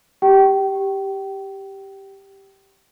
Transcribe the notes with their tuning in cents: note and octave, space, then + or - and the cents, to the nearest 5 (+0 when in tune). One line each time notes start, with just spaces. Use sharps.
G4 +0 G5 -30